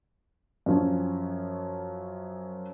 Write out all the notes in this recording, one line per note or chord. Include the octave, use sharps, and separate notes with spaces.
F#2 F3 C#4